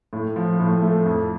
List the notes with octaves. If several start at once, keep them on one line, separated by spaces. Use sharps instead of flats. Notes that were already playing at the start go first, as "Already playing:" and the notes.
A2
F3
A2
A3
F2